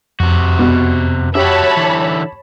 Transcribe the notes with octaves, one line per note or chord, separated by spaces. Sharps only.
F2 C3 F#4
B2
F#4 G4 C#5 E5 A5 B5
D3 E3